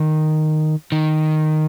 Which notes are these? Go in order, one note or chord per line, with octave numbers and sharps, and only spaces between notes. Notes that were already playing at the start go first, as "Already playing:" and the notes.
Already playing: D#3
D#3